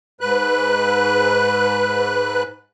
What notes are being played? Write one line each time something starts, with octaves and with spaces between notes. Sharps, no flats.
G#2 B4 F#6